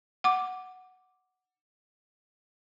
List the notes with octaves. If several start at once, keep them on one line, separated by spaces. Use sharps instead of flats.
F#5 D6